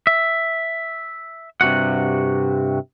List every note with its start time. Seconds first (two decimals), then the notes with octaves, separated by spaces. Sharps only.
0.07 E5
1.61 G2 C3 F#4 F#5